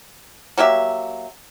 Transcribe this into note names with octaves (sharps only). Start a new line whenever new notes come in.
F#3 A#3 G4 E5